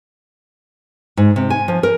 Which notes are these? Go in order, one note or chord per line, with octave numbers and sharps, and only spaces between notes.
G#2
C3
G#5
F3
A#4